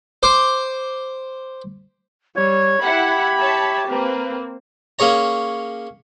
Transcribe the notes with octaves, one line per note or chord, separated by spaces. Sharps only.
C5 D6
G3 C#5 G#6
E4 G4 F#5 B5
C#5 E5 A5
A#3 C4 B4
A#3 C#4 G#4 C#5 A#5